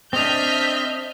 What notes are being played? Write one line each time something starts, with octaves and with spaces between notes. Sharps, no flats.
C4 D4 D#5 E5 F6 G6 B6